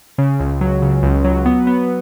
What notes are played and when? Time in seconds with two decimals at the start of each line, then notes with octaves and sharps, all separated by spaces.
0.18 C#3
0.40 C#2
0.61 F#3
0.82 C#3
1.03 C#2
1.24 F#3
1.46 B3
1.67 B3